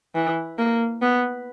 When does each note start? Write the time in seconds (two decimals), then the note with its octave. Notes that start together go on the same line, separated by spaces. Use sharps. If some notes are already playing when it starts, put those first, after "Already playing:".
0.15 E3
0.58 A#3
1.02 B3